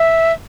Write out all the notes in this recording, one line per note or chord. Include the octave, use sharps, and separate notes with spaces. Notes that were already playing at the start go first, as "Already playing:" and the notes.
Already playing: E5